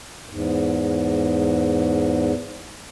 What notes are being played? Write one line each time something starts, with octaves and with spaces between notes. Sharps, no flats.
E2 G#2